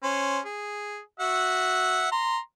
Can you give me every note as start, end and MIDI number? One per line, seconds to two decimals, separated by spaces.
0.03 0.39 61
0.03 0.39 72
0.45 0.99 68
1.20 2.07 66
1.20 2.07 76
1.20 2.07 78
2.12 2.38 82
2.12 2.38 84